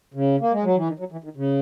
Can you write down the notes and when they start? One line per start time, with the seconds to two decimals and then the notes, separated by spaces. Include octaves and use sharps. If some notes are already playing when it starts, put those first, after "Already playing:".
0.14 C#3
0.40 A#3
0.52 G#3
0.64 F#3
0.76 E3
0.88 D#3
0.99 F#3
1.12 E3
1.24 D#3
1.37 C#3